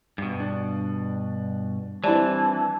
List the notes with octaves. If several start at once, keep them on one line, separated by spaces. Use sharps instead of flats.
G2 B2
D4
E3 G3 C4 D4 E4 D5 A5